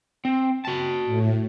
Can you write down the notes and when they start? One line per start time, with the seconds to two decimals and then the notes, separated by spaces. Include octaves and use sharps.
0.25 C4
0.65 F#4 A5
1.06 A2